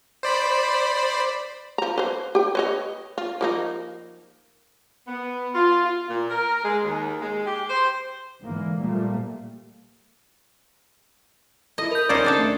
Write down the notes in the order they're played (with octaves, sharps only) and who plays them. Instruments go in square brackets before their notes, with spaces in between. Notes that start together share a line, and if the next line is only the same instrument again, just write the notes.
[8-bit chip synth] C5 D5 B5
[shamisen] F3 A#5
B4 C5
G4 G5
B4 C#5 D#5
F4
F3 A#3 D#4
[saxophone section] B3
F4
F4
A#2
A#4
G#3
D#2
G#3
G4
C5
[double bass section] G#2 D3 E3 A#3
A#2 F3 G3 A3 A#3
[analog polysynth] E4 A4 [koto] D#5
[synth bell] A#4 G6 [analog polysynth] B5
[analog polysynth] D#2 C#3 [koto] C#4 D#4 C5 [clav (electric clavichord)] D5
[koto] C4 D4 A4
[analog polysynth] A3